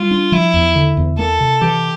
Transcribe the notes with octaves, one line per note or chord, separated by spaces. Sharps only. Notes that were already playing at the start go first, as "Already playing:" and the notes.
Already playing: G3 F4
D4
F3 E4
E2
D3
E2
A#3 A4
C3
E3 G4